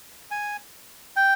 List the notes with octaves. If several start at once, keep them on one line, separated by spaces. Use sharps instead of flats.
G#5
G5